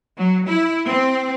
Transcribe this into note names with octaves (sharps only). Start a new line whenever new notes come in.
F#3
E4
C4